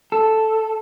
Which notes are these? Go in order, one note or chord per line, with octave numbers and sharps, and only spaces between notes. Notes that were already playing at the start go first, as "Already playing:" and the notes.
A4